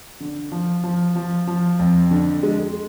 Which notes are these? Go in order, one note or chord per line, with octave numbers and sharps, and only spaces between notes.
D3
F3
F3
F3
F3
F2
D3
G#3